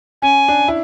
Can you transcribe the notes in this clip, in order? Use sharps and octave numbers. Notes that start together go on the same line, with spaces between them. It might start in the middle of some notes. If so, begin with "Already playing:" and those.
C#4 G#5
D4
E4